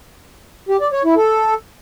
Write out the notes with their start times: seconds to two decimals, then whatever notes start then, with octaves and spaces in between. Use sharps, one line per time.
0.69 G4
0.81 D5
0.93 C#5
1.04 E4
1.16 A4